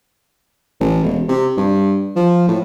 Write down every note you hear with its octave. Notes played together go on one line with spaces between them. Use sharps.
A1
E1
C3
G2
F3
A2